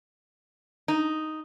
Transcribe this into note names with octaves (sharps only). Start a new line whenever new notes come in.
D#4